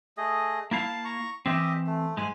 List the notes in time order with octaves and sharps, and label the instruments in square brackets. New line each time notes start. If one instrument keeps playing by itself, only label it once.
[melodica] A3 G#4 D#5
[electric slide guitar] A#3 E4 F5 [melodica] A5
[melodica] A#5 C#6
[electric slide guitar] E3 C4 [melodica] G4 D#5 E5
[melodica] A3
[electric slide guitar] G#2 G#3 [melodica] G#5